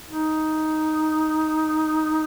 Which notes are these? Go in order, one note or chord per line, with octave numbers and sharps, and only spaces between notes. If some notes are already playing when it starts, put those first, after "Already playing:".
D#4